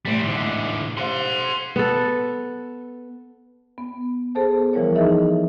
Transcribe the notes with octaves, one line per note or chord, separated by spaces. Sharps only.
E2 A2 G3 C4
G#2 D3
G4 C5 F5 F#5 C6
B3 A4
B3
B3 G#4 A4 C5 A5
E3 F3 G3 E4 A#4 C#5
D#4 G#4 A4 D#5 E5